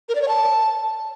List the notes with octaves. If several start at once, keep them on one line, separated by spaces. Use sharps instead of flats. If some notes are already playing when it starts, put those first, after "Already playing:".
A#4
D5
C#5
A5